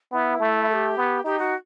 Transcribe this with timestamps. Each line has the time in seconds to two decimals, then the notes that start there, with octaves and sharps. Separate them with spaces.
0.12 B3 E4
0.40 A3
0.68 A4
0.73 G4
0.97 B3
1.24 D#4 G4
1.39 F#4